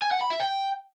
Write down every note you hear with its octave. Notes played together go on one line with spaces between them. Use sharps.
G#5
F#5
B5
E5
G5